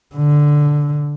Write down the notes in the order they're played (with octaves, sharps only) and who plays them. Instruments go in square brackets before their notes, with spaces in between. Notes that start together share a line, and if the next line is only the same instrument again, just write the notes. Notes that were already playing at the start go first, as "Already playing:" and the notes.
[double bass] D3